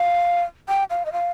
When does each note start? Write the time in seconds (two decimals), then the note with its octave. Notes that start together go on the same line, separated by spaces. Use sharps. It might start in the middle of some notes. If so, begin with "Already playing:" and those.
Already playing: F5
0.69 G5
0.90 F5
1.06 D#5
1.12 F5